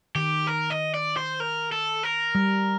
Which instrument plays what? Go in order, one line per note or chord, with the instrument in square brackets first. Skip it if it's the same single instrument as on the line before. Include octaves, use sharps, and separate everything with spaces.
[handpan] D#3 [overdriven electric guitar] G4
[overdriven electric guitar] A#4
D#5
D5
C5
A#4
A4
A#4
[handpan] G3